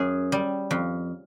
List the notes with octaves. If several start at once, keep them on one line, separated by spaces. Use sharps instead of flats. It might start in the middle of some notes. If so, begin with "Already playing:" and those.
Already playing: F#2 G#4
G3
F2